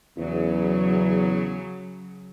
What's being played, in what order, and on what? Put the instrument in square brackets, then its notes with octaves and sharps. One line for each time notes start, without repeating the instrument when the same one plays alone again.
[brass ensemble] E2 [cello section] C#3 F#3